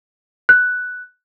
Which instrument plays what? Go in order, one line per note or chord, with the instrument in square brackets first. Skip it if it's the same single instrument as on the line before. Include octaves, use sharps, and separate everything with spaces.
[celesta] F#6